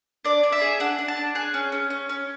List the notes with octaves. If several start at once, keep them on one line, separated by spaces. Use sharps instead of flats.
D4 D5
D4
E5
G#4
D4 F#5
D4
A5
D4
G#4 F#6
C#4
C#4
C#4
C#4